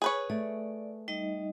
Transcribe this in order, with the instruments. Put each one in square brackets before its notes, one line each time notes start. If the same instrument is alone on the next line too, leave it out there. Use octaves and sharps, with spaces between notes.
[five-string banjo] G#4 B4 C#5
[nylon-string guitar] A3 [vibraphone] D5
[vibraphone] G3 D#4 D#5